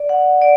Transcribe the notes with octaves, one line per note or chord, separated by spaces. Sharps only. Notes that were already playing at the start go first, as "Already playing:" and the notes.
Already playing: D5
F#5
D5